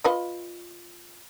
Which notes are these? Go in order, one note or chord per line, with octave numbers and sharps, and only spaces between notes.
F4 B4 D#5